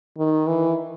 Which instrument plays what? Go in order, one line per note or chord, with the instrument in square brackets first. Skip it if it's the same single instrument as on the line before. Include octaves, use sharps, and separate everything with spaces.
[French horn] D#3
E3